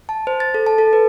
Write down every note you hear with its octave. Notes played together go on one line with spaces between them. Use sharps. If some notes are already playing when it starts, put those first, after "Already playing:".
A5
C5
A6
A4
A5
A4
B4